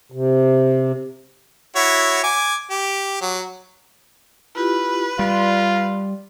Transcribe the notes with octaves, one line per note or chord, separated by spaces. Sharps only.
C3
E4 F#4 C#5
G#5 D6
G4
F#3
E4 F4 G4 B4
G3 F4 D5 C6